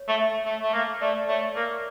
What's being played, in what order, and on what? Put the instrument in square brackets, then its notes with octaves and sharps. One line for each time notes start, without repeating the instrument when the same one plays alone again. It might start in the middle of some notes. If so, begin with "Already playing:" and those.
Already playing: [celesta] C#5
[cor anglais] A3
[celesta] E5
[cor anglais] A3
A3
A#3
[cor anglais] A3 [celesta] D5
[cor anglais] A3 [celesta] C#5
[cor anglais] A#3 [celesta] A#4